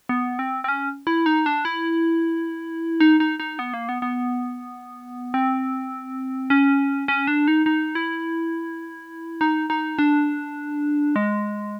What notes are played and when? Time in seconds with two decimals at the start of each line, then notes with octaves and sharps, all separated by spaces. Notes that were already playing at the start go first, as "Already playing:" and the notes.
0.09 B3
0.39 C4
0.64 C4
0.68 C#4
1.07 E4
1.26 D#4
1.46 D4
1.65 E4
3.00 D#4
3.20 D#4
3.40 D#4
3.59 B3
3.74 A#3
3.89 B3
4.02 B3
5.34 C4
6.50 C#4
7.08 C#4
7.27 D4
7.48 D#4
7.66 D#4
7.95 E4
9.41 D#4
9.70 D#4
9.99 D4
11.16 G#3